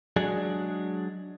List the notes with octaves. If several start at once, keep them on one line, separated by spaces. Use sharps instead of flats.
F#3 G#3 D4 G#4